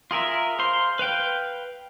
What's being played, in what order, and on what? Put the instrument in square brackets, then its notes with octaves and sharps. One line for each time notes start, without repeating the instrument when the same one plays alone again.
[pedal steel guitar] F4 G#4 A#4 E5
C5 F5 C6
B4 F5 G5